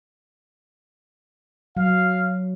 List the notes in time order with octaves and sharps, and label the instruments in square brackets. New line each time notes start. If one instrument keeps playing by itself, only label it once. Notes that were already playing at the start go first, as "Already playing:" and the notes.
[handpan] F#3 [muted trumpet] F5